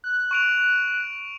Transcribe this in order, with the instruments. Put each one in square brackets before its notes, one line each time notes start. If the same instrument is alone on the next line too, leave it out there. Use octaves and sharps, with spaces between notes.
[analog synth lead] F#6
[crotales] C#6 D7 F7